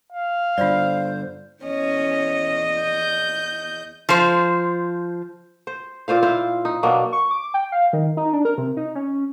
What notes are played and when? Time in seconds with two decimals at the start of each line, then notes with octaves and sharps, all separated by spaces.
0.13 F5
0.58 G2 D3 F4 C5 D5
1.64 E2 C#4 D#5
2.82 G6
4.09 F3 C5
5.67 C5
6.08 A#2 F4 C5 F5
6.23 E4 F4 C5 F5
6.65 D#4
6.83 B2 F#3 A#3 D4
7.12 C#6
7.31 D6
7.54 G5
7.72 F5
7.93 D#3
8.17 D#4
8.33 D4
8.45 A#4
8.58 C3
8.77 D#4
8.95 C#4